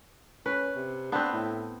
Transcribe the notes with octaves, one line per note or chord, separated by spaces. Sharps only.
C#4 B4
C3
B3 C4 D4
A2